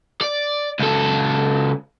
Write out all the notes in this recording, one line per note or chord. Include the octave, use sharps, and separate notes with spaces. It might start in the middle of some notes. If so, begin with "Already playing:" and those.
D5
C#2 A4